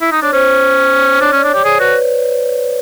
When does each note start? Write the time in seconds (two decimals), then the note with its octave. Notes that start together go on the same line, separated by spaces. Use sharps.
0.01 E4
0.11 D#4
0.22 D4 C#5
0.33 C#4 C5
1.21 D4 C#5
1.32 C#4 D5
1.44 D4
1.50 C#5
1.54 G4
1.64 G#4 C5
1.79 F#4 B4